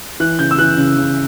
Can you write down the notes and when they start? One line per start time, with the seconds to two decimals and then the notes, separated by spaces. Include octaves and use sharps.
0.20 E3 F#6
0.39 C#3 G6
0.51 E6
0.58 E3 F#6
0.77 C#3
0.97 C#3